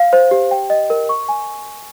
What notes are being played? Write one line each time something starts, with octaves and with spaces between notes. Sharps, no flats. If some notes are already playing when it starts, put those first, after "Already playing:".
Already playing: F5
C5
G4
G5
D#5
A#4
C#6
G#5